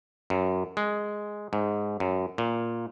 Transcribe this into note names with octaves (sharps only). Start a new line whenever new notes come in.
F#2
G#3
G#2
F#2
A#2